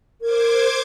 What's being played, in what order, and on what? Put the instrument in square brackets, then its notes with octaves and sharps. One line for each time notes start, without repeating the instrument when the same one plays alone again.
[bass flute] A#4 [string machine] C5 D6 G#6